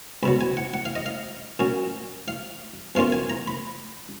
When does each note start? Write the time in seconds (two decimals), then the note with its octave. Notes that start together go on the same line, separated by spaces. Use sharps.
0.23 C#2 B2 F#3 B5
0.41 G#5
0.57 F#5
0.74 F#5
0.85 F5
0.95 D#5
1.06 F5
1.59 A#2 F#3 C#4
2.28 F5
2.95 B1 B2 A#3 C#4 F4 F5
3.12 G#5
3.30 A#5
3.47 B5